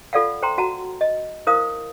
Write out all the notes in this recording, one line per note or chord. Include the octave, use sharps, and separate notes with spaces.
F4 A4 D5 F5 F#5
C5 G5 A#5 C6
F#4 F#5 A5 A#5
D#5
E4 A#4 C5 F5 D#6